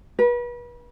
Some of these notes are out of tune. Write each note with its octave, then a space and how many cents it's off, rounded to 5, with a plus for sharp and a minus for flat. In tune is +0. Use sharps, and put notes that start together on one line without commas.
B4 -35